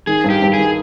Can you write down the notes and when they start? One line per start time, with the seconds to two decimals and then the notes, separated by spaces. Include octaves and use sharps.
0.07 D#3 G#4
0.24 G2
0.30 G4
0.42 G2
0.53 D#3 G#4